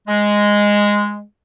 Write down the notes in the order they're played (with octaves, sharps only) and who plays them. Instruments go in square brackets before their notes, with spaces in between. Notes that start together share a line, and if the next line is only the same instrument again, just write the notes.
[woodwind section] G#3